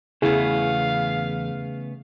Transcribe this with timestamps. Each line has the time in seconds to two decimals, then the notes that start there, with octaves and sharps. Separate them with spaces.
0.22 E2 C#3 E3 A3 B3 E4 G#4 F5